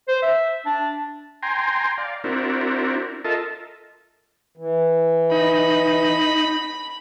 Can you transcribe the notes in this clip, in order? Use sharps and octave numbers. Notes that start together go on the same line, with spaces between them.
C5
E5
D4
G5 G#5 A#5 C6
D5 F5
C4 D4 E4 F#4 A#4
F4 A4 A#4 D#5 E5 A5
E3
D#4 B5